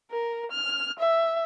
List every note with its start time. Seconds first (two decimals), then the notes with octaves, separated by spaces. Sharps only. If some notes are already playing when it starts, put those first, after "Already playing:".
0.12 A#4
0.51 F6
0.99 E5